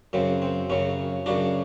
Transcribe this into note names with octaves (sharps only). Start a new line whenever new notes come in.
F#2 C#3 F#3 C4
C4
F#2 C#3 F#3 C#4
F#2 C#3 F#3 D4